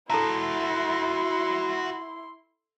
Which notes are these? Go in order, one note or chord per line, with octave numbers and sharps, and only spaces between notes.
E4 F#4 A4 E5 A5 A#5 C6